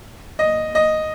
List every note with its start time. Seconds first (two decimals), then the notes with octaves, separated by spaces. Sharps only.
0.39 D#5
0.75 D#5